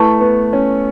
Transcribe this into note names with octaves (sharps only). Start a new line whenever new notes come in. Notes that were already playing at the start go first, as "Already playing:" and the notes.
Already playing: A3 E4 B4 A5 C#6
B3
C#4